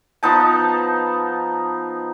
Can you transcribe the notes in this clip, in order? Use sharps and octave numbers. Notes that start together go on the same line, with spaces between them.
F3 B3 D#4 A5